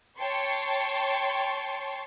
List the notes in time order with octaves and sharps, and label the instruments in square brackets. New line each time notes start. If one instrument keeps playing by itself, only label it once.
[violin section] C#5 G5 A5 C6 C#6